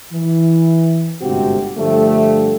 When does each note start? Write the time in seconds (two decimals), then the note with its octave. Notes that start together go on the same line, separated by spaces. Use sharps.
0.12 E3
1.21 G1 G#2 C3 C4 F#4 G4
1.77 G2 D3 F3 G3 A3